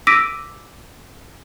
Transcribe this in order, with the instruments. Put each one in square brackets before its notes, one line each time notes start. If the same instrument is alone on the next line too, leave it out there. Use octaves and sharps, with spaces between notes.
[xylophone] D6 E6 A#6 B6 D7 D#7